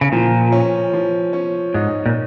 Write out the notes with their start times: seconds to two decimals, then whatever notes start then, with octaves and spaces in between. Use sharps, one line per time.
0.01 C#3
0.12 A#2 F3
0.52 C#4
0.93 F3
1.33 C#4
1.74 G#2 D#4
2.06 A#2